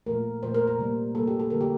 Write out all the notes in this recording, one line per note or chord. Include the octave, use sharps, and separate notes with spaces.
A#2 F3 A3 A#4
A#2 F3 A3 C5
A#4
A#4
C3 G3 A#3
C3 G3 A#3 A4
G4
A4
D3 G3 A#3 A#4
G4